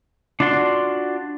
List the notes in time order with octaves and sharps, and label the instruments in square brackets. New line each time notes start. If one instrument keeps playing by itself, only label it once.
[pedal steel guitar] D4 F4 F#4 D5 C6